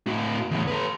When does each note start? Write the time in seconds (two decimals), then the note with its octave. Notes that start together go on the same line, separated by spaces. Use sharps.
0.07 A2 F#4
0.51 E2 A2
0.68 A4 B4